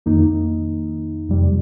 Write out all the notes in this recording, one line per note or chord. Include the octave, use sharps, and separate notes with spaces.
F2 D#3 A#3 D#4
F2 C3 G3